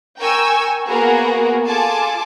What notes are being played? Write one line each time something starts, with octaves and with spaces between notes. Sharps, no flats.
A#4 G5 G#5 C#6 E6
A#3 B3 F#4 G#4 A#4
F4 G#4 A4 G#5 A5 D6